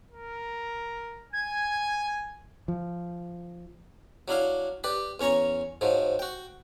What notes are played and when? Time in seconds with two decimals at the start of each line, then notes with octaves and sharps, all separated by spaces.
0.11 A#4
1.33 G#5 G#6
2.68 F3
4.28 F#3 D4 E4 F5
4.84 G4 B4 D5
5.20 E2 C#4 C#5 A#5 C#6
5.81 G#2 F3 F#3
6.19 F#4 G5